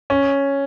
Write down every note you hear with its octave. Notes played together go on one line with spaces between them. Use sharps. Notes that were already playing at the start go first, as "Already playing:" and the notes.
C#4